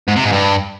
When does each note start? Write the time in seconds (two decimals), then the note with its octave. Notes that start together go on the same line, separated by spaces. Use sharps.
0.08 G#2
0.16 C3
0.24 G#2
0.32 G2